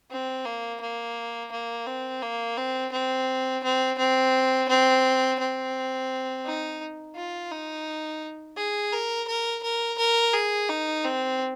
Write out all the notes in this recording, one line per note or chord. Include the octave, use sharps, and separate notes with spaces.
C4
A#3
A#3
A#3
C4
A#3
C4
C4
C4
C4
C4
C4
D#4
F4
D#4
G#4
A#4
A#4
A#4
A#4
G#4
D#4
C4